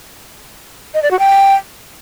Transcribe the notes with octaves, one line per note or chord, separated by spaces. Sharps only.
D#5
D5
F#4
G5